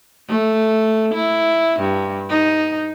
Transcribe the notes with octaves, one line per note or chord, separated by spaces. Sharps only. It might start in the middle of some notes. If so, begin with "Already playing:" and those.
A3
E4
G2
D#4